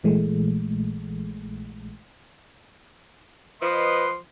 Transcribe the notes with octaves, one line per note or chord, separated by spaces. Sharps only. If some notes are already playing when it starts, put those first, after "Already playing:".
A#1 A#2 E3 G#3 A3
F3 B4 D#5 C6